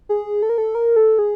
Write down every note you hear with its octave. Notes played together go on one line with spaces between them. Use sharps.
G#4
A4
A#4
A4
A#4
A4
G#4